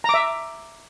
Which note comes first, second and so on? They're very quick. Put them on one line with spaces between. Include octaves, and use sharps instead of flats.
A#5 D6 E5